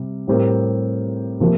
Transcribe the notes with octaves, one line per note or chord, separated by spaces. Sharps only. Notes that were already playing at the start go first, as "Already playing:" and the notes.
Already playing: C3 G3
A2 G3 C4 G4 A#4
C3 F3 A#3